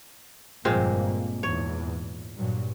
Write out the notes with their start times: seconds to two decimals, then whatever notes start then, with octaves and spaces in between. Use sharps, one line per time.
0.65 G1 F2 A#2 G#3 A#3 C4
1.43 E2 G#2 C#5
2.36 G2 A#2 F#3